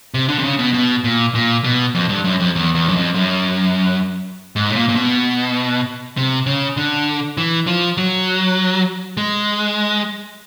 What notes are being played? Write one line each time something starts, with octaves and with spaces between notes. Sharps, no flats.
C3
D3
C3
C#3
B2
B2
A#2
A#2
B2
F2
G2
F#2
F2
E2
E2
F#2
F2
F#2
G#2
A2
A#2
A#2
B2
C3
C#3
D3
E3
F3
F#3
G#3